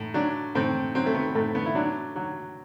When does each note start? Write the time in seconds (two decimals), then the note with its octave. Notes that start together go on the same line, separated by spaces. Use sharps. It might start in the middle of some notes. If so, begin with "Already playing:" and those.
Already playing: A2
0.14 F#3 D4
0.55 A2 C4
0.95 F#3 C4
1.06 A3
1.15 B3
1.35 A2 A3
1.55 B3
1.66 E4
1.75 F#3 D4
2.16 F#3